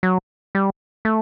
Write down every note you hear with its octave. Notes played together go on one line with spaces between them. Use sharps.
F#3
G3
A3